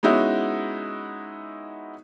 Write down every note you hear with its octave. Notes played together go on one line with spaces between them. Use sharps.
G#3 B3 C#4 D#4 E4 F#4